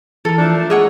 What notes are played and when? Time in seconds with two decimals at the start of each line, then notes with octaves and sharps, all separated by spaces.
0.25 E3 A4 A#4
0.38 F3 A3 D4
0.70 G#3 A#4 C#5 F#5 D#6